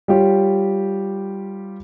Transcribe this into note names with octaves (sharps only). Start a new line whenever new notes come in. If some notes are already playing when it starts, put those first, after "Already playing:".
G3 F4 G4 C#5